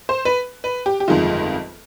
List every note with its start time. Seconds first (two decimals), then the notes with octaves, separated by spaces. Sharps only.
0.09 C5
0.25 B4
0.64 B4
0.86 G4
1.00 G4
1.08 G1 F2 D#3 G#3 F4